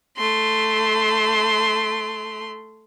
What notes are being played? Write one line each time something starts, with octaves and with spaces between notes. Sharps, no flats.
A3 C6